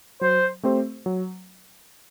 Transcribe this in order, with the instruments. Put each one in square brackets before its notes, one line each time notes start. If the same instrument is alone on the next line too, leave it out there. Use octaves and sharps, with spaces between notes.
[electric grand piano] F#3 [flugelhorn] C5
[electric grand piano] A3 C4 G4 C5
F#3